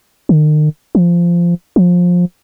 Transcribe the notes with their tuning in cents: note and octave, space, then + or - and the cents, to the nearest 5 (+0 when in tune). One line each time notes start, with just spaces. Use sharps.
D#3 -40
F3 -15
F3 +20